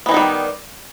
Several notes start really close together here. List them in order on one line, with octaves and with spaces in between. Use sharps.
B3 E3 D#4 D#3 G3